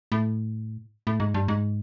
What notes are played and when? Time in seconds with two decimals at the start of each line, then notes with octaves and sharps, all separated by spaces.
0.12 A2
1.07 A2
1.20 G#2
1.34 G2
1.48 G#2